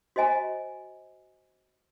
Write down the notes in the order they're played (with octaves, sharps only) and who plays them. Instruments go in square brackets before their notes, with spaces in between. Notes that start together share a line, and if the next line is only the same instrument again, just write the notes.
[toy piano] F#4 C5 D#5 G#5 A#5